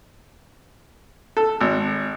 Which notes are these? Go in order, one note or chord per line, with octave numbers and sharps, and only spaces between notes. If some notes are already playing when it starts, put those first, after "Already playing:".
A4
G#1